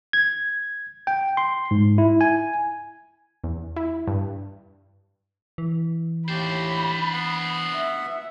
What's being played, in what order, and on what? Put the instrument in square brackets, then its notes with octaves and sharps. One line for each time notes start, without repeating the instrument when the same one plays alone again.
[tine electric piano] G#6
G5
C6
G#2
E4
G#5
[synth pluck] E2
E4
G2
[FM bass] E3
[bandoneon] D#2 A2 G4 [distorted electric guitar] D4 C5 [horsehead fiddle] B5
[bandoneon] B3 F#5
[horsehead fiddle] E5